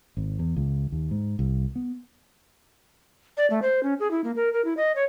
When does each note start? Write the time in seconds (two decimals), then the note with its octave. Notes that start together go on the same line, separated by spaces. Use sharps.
0.17 G#1
0.39 E2
0.56 C#2
0.92 D#2
1.11 G#2
1.39 C2
1.76 B3
3.37 D5
3.50 A3
3.62 C5
3.83 C#4
4.00 G#4
4.11 E4
4.24 A#3
4.36 A#4
4.53 A#4
4.65 E4
4.77 D#5
4.96 C#5